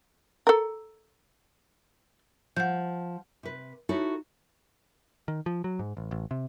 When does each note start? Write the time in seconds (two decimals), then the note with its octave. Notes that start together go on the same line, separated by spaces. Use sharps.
0.47 A4 A#4
2.56 F3 F#5 G6
3.43 C3 B4
3.89 D#4 E4 F#4 A4 B4 C#5
5.28 D#3
5.46 F3
5.64 F#3
5.79 G#2
5.97 A1
6.11 A1
6.31 C3